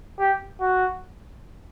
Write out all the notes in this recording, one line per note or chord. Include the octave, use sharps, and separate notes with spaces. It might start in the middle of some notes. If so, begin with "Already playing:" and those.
G4
F#4